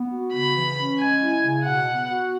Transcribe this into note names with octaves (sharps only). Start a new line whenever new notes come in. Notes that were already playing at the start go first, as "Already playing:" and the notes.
Already playing: B3
F#4
C#3 B5
E3
C#4
G#3 G#5
E4
C#3
B2 F#5
B3
F#4